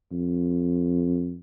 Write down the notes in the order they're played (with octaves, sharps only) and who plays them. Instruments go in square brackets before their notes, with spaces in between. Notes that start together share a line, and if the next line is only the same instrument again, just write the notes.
[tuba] F2